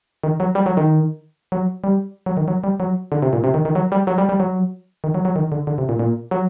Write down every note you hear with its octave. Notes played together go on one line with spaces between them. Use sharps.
D#3
F#3
G3
F#3
D#3
F#3
G3
F#3
D#3
F#3
G3
F#3
D3
C3
A#2
C3
D#3
D#3
F#3
G3
F#3
G3
G3
F#3
D#3
F#3
F#3
D#3
D3
D3
C3
A#2
A#2
F#3